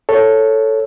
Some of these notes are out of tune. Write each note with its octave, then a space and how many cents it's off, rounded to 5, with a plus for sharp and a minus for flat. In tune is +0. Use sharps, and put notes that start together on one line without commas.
A4 +0 C#5 +0